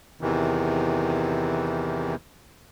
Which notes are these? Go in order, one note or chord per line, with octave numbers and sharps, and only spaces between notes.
E2 C3 D#3 E3